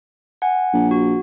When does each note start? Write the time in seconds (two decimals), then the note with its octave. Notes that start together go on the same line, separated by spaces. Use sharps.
0.42 F#5 G#5
0.73 A#1
0.91 F#4